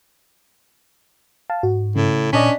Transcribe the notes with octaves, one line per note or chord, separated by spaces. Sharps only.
F5 A5
G#2 F#4
A2 C#3
A#2 C#4 D4 D5 D#5 B6